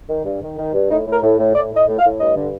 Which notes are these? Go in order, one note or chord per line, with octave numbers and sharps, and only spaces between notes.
D#3
G2
D#3
D#3
G2
A2 D#4
A2
A#4
A2
A2
A2 D5
A2
D#5
A2
F5
A2
G2 D#5
D3